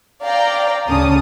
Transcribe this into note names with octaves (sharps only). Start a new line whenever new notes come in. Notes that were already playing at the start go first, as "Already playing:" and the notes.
D5 F5 G5 A#5
D2 C#3 C#4 A5 D#6